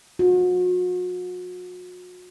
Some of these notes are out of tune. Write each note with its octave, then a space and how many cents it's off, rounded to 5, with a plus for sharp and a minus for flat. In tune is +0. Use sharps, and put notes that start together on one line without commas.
F#4 -40